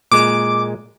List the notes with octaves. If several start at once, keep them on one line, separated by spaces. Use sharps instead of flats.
A#2 G#3 D6